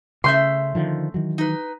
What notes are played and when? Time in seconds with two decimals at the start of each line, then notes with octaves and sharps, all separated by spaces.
0.24 C#3 A3 C#4 E5 C6 G6
0.75 D3 D#3 F3
1.14 D#3 E3 F#3
1.38 D#4 B4